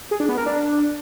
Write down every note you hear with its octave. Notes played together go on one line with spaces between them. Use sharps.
G#4
D4
B3
A#4
D4